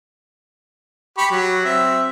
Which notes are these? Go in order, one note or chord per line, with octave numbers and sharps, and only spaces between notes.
G4 B5 C#6
F#3
C4 E5